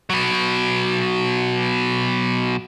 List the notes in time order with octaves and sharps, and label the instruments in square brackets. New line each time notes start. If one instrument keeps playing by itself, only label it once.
[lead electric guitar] B2 F#3